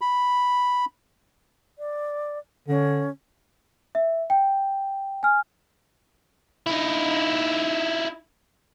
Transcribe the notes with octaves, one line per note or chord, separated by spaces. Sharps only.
B5
D5
D3 C#4
E5
G5
G#5 F6
D#4 E4